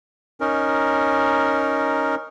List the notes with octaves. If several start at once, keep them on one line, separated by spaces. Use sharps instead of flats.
C#4 D#4 A#4